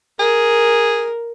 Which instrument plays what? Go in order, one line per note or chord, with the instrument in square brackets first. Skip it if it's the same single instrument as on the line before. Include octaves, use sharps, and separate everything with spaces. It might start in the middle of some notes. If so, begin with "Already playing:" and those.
[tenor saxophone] G#4 [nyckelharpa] A#4